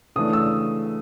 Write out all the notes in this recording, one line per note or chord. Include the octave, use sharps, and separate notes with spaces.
C#3 E3 A3 D4 D#6
E6